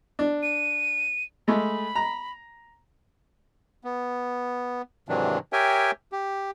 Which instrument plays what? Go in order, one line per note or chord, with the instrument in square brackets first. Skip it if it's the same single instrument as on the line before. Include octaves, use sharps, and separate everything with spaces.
[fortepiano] D4
[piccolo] D#7
[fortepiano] G#3 A3 [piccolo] B5
[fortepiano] A#5
[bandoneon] B3
G#2 C3 D#3 E3 F#3 D4
G4 A#4 C#5 E5 G5 G#5
G4